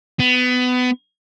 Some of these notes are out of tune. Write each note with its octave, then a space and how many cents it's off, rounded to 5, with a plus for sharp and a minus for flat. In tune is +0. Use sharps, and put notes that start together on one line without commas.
B3 +25